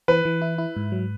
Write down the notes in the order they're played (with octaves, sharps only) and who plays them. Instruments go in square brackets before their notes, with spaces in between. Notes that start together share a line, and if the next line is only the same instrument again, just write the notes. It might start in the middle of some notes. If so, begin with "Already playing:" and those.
[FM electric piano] E3 [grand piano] B4
[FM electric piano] E3
E4
E4
G#2
F#3